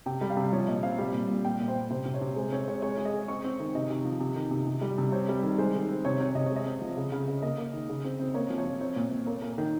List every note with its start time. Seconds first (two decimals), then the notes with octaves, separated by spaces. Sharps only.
0.06 C3 G5
0.21 G3
0.30 F5
0.37 C3
0.53 F3 C#5
0.68 A#2 D#5
0.83 C4 F5
0.98 G3
1.14 A#2
1.29 A#2
1.45 A#2 G5
1.60 A#2
1.68 C5
1.75 A#2
1.90 C3 C5
2.06 C3
2.14 C#5
2.21 C3
2.36 G#3 C5
2.52 C4 C#5
2.67 G#3 C#5
2.82 G#3 C#5
2.97 G#3
3.05 D#5
3.13 G#3
3.28 C4 C#6
3.44 C4
3.60 D#3
3.75 C3 D#5
3.90 C3
4.05 F3
4.20 C3
4.36 D#3
4.51 C3
4.67 C3
4.81 G3
4.98 C3
5.12 C4 C#5
5.28 G3
5.43 D#3
5.58 G#3 C5
5.74 D#3
5.89 C4
6.05 C3 C#5
6.20 C4 C#5
6.35 C3 D#5
6.46 G#3 C#5
6.56 D#5
6.66 C4
6.81 F3
6.97 C#3
7.12 C#3
7.28 C#3
7.42 A#3 D#5
7.58 A#3
7.74 D#3
7.89 C#3
8.04 C4
8.20 C4
8.34 A#3 C#5
8.50 F3
8.58 C#5
8.65 F3
8.80 C4 C#5
8.96 A#2
9.11 A#2
9.26 A#3 C#5
9.42 A#3
9.58 D#3